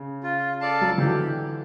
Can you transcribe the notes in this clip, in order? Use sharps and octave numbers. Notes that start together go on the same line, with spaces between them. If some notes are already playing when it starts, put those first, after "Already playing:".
Already playing: C#3
F4
A4 D5 F5 A5
F#3
F3
D3 E3 G4